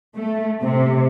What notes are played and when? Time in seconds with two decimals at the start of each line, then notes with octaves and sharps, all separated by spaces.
0.15 A3
0.62 C3